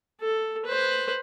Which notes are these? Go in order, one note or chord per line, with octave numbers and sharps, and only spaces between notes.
A4
B4 C5